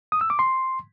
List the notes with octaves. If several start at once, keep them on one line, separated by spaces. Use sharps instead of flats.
D#6
E6
D6
C6